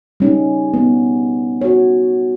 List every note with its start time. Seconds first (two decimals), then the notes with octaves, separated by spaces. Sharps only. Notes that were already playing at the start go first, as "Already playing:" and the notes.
0.20 G3 C#4 D#4
0.74 B3
1.61 F#4 C#5